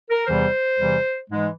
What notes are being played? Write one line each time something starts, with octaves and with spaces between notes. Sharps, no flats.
A#4
E2 C3 E3 G3 C5
E2 C3 E3 G3
G#2 E3 G#3